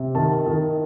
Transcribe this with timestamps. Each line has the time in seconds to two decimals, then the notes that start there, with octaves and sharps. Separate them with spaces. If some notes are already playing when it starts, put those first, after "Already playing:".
Already playing: C3
0.15 D#3 A5
0.46 D#3